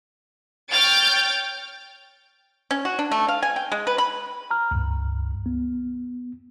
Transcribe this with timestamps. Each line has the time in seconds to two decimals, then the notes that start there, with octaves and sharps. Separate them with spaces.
0.70 C#5 G5 F6 G6 A6 D7
2.71 C#4
2.85 F#4
2.99 D4
3.11 A3
3.28 F5
3.42 G#5
3.56 G5
3.72 G#3
3.87 B4
3.98 B5
4.51 A#5 F6
4.71 C#2 G2
5.46 B3